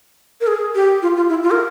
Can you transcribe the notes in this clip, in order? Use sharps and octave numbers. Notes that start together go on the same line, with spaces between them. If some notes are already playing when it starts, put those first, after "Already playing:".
A#4
G#4
G4
F4
F4
E4
F4
A#4